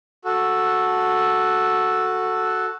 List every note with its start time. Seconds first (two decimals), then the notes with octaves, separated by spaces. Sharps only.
0.25 F#4 A4